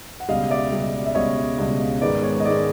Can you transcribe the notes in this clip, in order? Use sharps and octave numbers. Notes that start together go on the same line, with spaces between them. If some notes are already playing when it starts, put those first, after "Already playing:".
F#5
C#2 B2 G3 D#5 F5
D5 E5
C#2 B2 G3
E5
C#2 B2 G3 C#5 D#5
C#2 B2 G3
G#2 D#3 G#3 B3 D5
C#5
D#5
G#2 D#3 G#3 B3 D5